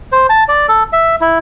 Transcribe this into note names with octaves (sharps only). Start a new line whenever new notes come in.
C5
A5
D5
A4
E5
E4